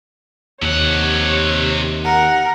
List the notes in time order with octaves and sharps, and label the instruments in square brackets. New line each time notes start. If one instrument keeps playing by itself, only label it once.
[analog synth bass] D#2 [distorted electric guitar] C3 F#5 [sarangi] C#5
[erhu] A#4 [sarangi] F#5